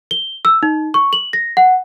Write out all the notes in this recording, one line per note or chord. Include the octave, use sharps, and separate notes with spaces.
G7
E6
D#4
C#6
F#7
A#6
F#5